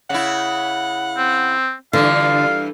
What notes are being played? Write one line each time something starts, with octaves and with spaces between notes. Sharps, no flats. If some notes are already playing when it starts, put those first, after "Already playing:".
C#3 E4 F#5
C4
G2 D3 E3 F4 F5